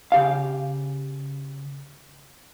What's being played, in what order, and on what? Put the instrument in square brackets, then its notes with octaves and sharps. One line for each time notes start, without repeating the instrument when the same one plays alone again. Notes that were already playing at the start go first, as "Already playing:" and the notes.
[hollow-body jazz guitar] C#3 G4 F5